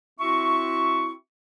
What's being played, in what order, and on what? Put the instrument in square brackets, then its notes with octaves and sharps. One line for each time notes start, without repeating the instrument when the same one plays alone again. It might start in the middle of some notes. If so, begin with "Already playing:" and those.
[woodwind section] C4 E4 F#4 E5 C#6